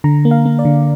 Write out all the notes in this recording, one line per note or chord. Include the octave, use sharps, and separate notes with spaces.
D3 A#5
A#3
F5
A#3
D5
D3